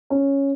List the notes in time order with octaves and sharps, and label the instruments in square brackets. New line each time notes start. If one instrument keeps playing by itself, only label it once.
[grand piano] C#4